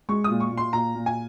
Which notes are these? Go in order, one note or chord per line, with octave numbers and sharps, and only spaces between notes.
G#3 C#6
D#6
A#2
C#6
A#2
C6
A#2 A#5
A#2
G#5